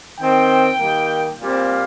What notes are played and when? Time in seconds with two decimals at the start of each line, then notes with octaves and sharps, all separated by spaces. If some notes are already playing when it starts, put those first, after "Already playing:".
0.20 D#3 C4 G5
0.79 D#3 G3 A#3
1.39 A#2 G3 C4 F5